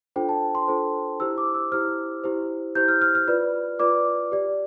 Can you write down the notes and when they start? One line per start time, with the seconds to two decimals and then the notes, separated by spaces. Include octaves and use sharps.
0.16 D4 F4 A4 C5 G5
0.29 A5
0.55 C6
0.68 D4 F4 A4 C5
1.20 E4 G4 C5 E6
1.38 D6
1.54 E6
1.72 E4 G4 C5 F6
2.24 E4 G4 C5
2.75 E4 G4 C5 G6
2.88 F6
3.02 F6
3.15 F6
3.28 F4 B4 D5
3.79 F4 B4 D5 D6
4.32 G4 D5